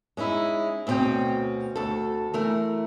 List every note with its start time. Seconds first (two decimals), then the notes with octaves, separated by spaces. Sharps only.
0.17 G#3 C#4 D#4 E4
0.87 D2 B2 C4 C#4 G5
1.76 D2 A4
2.34 E3 A3 A#4